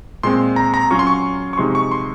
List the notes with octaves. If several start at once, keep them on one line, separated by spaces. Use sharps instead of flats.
A#2 G#3 C4 C6
A#5
A#5
F#3 C#4 F4 C#6
C6
C#6
C#6
C3 F3 G#3 D#4 C6
C#6
C6